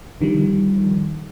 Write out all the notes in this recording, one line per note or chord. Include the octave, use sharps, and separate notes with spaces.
D3 D#3 F3 G3